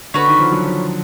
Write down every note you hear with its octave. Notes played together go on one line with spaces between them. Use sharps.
D3 C#4 F#4 B4
D#3
F3
F#3
F3